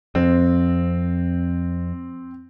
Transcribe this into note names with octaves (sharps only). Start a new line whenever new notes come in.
F2 C4